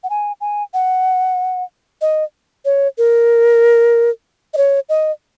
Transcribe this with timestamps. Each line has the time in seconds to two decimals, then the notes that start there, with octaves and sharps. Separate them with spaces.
0.04 F#5
0.10 G#5
0.41 G#5
0.74 F#5
2.01 D#5
2.65 C#5
2.98 A#4
4.54 D#5
4.57 C#5
4.89 D#5